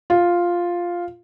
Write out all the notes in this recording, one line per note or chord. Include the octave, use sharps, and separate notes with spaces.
F4